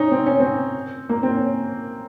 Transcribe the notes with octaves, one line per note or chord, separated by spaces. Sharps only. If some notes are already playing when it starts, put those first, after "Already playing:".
Already playing: C#4 D#4
C4
C#4
C4
A#3
C4
C#4